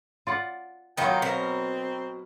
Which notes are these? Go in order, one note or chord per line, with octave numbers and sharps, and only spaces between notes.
F4 D5 F#5
D#3 F#3 B3 D#4 F4 G5
B2 C4 A#4